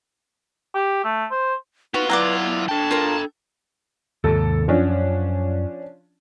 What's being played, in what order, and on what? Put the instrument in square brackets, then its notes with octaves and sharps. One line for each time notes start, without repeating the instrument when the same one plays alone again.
[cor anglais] G4
A3
C5
[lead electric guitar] B3 B4 [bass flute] D#4 [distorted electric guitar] F4 [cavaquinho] F#4
[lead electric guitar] F#3 E4 [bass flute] B4 [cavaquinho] D5 F#5 A#5
[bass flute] B3
[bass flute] D4 [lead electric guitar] A4 G5 [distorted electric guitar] A5
[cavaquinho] F4 A#4 A#5
[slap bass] D#2 G#2 C3 [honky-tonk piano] A4
[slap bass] F#2 [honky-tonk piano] F3 C#4 D4